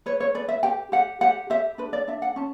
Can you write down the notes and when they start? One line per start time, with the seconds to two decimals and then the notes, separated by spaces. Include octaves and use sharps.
0.06 B4 C#5
0.20 C#5
0.35 B4 D5
0.49 E5
0.63 G4 G5
0.92 G4 F#5
1.21 G4 F#5
1.50 G4 E5
1.78 D4 B4
1.93 D5
2.08 D4 E5
2.22 F#5
2.36 C#4 A5